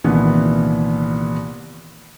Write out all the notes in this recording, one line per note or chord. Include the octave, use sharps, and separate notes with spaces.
C2 A#2 D#3 E3 B3